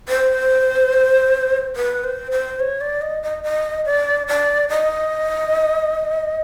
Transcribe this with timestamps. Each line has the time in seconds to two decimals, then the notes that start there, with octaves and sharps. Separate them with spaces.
0.09 C5
1.76 B4
2.04 C5
2.32 C5
2.60 C#5
2.81 D5
3.02 D#5
3.23 D#5
3.43 D#5
3.86 D5
4.28 D5
4.69 D#5